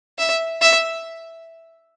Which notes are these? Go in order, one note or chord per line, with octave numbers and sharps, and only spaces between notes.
E5
E5